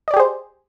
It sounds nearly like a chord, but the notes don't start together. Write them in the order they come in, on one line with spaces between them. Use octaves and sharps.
D#5 D5 G4 G#4 C5